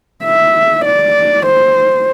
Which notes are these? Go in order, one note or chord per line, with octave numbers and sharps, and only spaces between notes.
E5
D5
C5